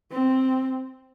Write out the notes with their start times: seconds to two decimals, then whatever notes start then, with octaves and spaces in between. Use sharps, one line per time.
0.12 C4